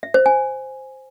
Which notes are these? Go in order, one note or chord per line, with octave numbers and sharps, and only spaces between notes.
E5
C5
G#5